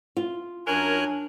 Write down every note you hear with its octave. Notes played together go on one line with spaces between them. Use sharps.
F4
F#2 D4 A#4 C#5 G#5 F#6